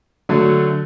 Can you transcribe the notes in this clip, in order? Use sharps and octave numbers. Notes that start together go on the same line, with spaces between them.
D3 F#3 A3